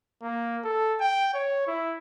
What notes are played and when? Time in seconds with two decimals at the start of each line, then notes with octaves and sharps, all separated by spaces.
0.22 A#3
0.64 A4
1.01 G5
1.34 C#5
1.67 E4